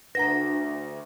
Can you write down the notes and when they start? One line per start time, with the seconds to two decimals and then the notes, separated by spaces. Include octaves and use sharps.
0.15 D2 D4 B4 F#5 A#5 A#6